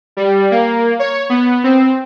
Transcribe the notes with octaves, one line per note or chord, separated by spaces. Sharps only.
G3
A#3
C#5
B3
C4